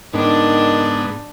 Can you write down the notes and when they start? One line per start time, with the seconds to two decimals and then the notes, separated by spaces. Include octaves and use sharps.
0.14 G#2 D#3 B3 D4